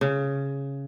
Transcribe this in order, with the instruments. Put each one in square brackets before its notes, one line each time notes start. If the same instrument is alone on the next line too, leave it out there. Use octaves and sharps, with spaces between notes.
[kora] C#3